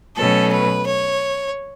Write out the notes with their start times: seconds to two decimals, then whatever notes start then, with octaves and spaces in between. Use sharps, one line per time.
0.16 B2 F#3 A3 C#4 A4
0.51 B4
0.86 C#5